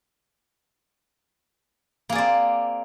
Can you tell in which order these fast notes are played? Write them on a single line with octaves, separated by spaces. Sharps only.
A#3 G#4 D5 C4